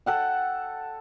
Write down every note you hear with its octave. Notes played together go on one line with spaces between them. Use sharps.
A4 F#5 G5